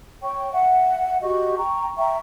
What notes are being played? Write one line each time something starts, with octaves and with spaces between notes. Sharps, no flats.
C#5 G5 C#6
E5 F#5
F#4 G4 D#5 C#6
G5 A#5 C#6
E5 G5 A#5 C#6